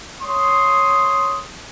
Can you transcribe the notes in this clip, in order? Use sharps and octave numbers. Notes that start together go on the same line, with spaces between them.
C#5 C6 D#6